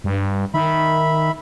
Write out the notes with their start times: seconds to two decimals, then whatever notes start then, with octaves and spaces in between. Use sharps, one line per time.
0.04 G2
0.54 D#3 E5 B5